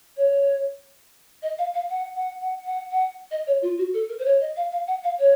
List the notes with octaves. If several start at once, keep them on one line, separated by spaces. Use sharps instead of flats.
C#5
D#5
F5
F5
F#5
F#5
F#5
F#5
F#5
D#5
C#5
F4
F#4
A4
A#4
C5
C#5
D#5
F5
F5
F#5
F5
C#5